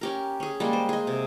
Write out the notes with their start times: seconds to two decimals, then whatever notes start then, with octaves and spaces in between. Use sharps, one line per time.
0.01 C#4 G4 A#4
0.40 C#4 G#4
0.60 G3 G#3 A#3 G4
0.73 C5
0.89 G#4 D#5
1.07 C3